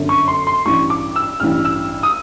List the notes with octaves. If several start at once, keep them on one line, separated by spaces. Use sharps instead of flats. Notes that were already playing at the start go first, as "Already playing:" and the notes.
Already playing: G1 F#2 D3
C#6
C6
C6
A1 G2 E3 C#6
D6
E6
A1 G2 E3 F6
E6
D#6